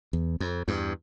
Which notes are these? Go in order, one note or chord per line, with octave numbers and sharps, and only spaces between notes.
E2
F2
E2 G2